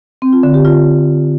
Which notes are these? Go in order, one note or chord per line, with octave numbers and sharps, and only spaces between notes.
C4
F4
D3
G4
F4